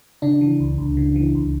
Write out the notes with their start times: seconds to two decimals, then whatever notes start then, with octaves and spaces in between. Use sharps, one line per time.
0.22 C#3 D4
0.41 E3
0.60 C#2
0.78 C#2
0.97 C#3
1.16 E3
1.35 C#2